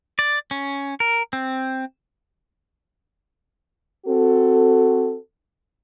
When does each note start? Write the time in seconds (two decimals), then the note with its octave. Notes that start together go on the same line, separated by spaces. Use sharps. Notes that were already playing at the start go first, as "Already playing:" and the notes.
0.19 D5
0.51 C#4
1.00 A#4
1.33 C4
4.06 C4 F#4 A4